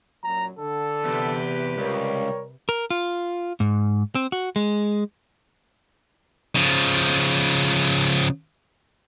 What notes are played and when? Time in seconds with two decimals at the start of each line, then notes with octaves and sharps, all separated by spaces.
0.23 F#2 A#2 F#3 A#5
0.59 D3 A4
1.04 E2 C3 G4 B4
1.77 C#2 G3 A#4 C#5
2.69 A#4
2.90 F4
3.60 G#2
4.15 C4
4.32 F#4
4.56 G#3
6.56 C#3 F3